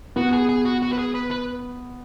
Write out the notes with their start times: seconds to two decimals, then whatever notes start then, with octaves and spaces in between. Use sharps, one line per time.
0.16 B3 F#4
0.33 G#4
0.49 G#4
0.65 F#4
0.83 F#4
0.93 B4
0.99 G#4
1.15 B4
1.31 B4